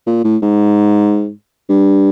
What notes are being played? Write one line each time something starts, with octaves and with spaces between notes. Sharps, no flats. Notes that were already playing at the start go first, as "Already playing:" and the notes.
A#2
A2
G#2
G2